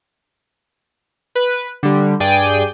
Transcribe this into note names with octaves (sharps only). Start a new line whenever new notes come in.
B4
D3 G3
G2 G#4 D5 G5 D#7